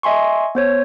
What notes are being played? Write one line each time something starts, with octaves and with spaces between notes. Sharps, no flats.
D#5 E5 G#5 C6 C#6
B3 C5 C#5